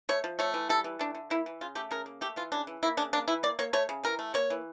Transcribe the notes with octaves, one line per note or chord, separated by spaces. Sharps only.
A3 C#5
F3
A3 C#5
E3
G3 A4
E3
A3 D4
D3
A#3 E4
E3
C#3 F4
A3 G4
C#3 A#4
A#3
A3 G4
E3 F4
C#3 D4
E3
A#3 E4
C#3 D4
A#3 D4
E3 E4
A#3 D5
A#3 C#5
A3 C#5
C#3
E3 A#4
A3
A#3 C#5
E3